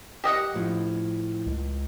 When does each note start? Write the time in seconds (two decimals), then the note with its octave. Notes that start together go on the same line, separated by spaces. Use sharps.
0.24 G4 D#5 F#5
0.55 A2 F3
1.46 C#2